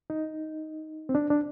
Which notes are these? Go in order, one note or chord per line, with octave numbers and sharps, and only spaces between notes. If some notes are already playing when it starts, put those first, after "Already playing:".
D#4
C4
D4
D4